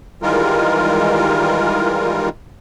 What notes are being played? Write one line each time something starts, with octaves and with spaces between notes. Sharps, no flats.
D#3 E3 G3 G#3 F4 A#4